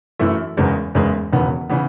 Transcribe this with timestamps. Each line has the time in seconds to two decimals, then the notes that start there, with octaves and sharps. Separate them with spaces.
0.19 F#2 E3 A3 E4
0.57 F#1 E2 C#3 G#3
0.95 F#1 E2 C#3 G#3
1.32 E1 D#2 C#3 E3 B3
1.69 C#3 E3 B3